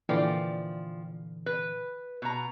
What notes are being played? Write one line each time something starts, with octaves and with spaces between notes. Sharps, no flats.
A#2 D3 E3 F3 D5 G5
B4
B2 A#5